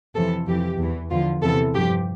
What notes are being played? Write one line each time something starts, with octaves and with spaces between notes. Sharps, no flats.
F2 C3 E3 A4
F2 E3 G4
E2 E3
E2 D3 F3 F4
E2 C3 E3 A4
G2 F3 G4